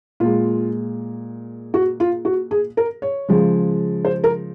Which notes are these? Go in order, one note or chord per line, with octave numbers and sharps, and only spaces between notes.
A#2 G#3 F4
F#4
F4
F#4
G#4
A#4
C#5
C#3 F3 G#3
C5
A#4